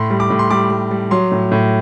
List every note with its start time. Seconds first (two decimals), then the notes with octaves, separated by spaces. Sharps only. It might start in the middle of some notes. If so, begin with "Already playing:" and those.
Already playing: A2 C6
0.10 G3
0.20 D6
0.30 A2
0.39 C6
0.51 G3 D6
0.70 G3
0.91 G3
1.11 F#3 C6
1.32 A2
1.52 A2